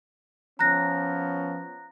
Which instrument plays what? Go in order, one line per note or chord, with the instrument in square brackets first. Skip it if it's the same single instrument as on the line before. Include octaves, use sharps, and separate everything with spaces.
[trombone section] F3 B3 C#4 [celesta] A#5 F#6 A#6